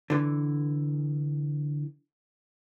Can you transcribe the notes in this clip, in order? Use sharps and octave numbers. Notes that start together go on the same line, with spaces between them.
D3 E3